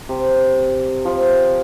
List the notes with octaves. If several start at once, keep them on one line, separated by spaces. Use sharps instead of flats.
C3
F3